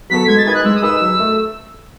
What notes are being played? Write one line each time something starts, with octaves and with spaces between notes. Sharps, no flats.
F#3 B3 F#4 A4 B6
G#3 G#6
A6
D#4 G#4 B4 G#6
F#6
G#3 E6
D#6
D#4 G#4 B4 E6
F#3 E6
A3